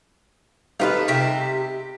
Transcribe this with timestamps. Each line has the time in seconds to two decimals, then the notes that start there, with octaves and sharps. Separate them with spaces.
0.80 G3 D#4 F4 A4 B4 F5
1.08 C3 G4 E5